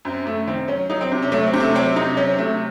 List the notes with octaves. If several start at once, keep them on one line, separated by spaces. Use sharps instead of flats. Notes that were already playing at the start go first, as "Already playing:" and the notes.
F#2 C4
F#2 A3
D#3 C4
F#3 C#4
F#3 D#4
C4
C3
C#4
F#3 A3
C4
C3
A3
F#3 C4
C3 D#4
F#3 C#4
C3 A3